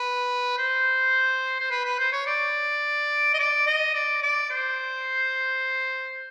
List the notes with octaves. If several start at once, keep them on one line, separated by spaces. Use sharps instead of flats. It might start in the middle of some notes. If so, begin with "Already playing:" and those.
Already playing: B4
C5
C5
B4
B4
C5
C#5
D5
D#5
D5
D#5
D5
D5
C5